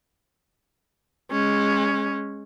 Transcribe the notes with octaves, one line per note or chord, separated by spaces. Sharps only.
G#3 C#4